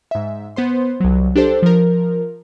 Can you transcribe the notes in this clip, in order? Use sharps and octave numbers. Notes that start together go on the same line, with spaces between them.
G#2 E5
B3 C5 C6
C2 F#3
D4 G4 A4 C5
F3 A#4